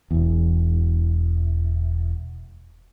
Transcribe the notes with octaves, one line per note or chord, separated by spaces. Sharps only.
E1 E2